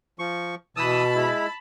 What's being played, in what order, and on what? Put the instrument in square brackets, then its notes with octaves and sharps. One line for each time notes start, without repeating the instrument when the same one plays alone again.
[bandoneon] F3 C#6
[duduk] B2 [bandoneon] E3 D#6 E6 [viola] A5 B5
[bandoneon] G#3 E4